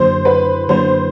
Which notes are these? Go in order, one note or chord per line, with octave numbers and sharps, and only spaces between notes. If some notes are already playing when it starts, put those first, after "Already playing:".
Already playing: F#2 D3 F#3 A#3 C5
B4
F#2 D3 F#3 A#3 C5